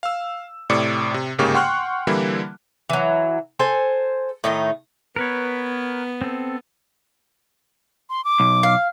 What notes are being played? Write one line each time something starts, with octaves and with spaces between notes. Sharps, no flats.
F5 E6
A2 C3 D5 D6 C#7
C3
G1 G#2 C#3 A#3 G4 C#6
F#5 G5 C6 C#6 F6 F#6
D3 E3 G3 A#3 E4
E3 F#3
A4 C5 G#5
A2 D#3 D#4
B3 A#4 B4 C#5
C4 A4
C6
D6
B1
F5